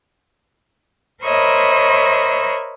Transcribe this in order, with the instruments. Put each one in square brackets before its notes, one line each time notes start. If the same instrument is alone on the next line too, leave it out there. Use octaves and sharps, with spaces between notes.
[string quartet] A#4 C5 C#5 D#5 E5 B5